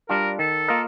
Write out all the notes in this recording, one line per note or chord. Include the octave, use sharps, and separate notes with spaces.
G3 D4 F4 A#4
D#3 A4
A#3 F4 A#4 D#5